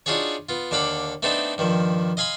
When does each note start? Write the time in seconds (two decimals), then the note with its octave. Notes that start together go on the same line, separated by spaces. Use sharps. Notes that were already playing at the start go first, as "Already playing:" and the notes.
0.06 D4 D#4 F4 F#4 G#4 C#5
0.49 B3 F4
0.71 D#2 D3 F5 F#5 B5 D6
1.23 A3 B3 C4 D4 D#4 A4
1.58 G2 D#3 F3
2.17 D#5 F5 G#5 B5 C6